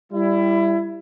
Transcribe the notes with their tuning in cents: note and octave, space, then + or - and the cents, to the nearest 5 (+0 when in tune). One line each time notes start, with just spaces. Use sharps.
G3 +5 E4 +20